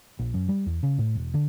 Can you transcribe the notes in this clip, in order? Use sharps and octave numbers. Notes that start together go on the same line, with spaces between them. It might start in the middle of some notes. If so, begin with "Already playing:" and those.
A#1
F#2
G3
E2
C#3
A2
E1
D3